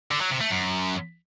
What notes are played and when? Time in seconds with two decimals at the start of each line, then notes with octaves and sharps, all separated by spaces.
0.11 D3
0.21 F#3
0.31 C3
0.41 A3
0.51 F#2